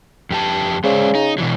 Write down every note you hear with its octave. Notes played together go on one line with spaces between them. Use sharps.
F2 G4 A5
C#3 G#3 C5 D5
D#4
B2 E3 F#3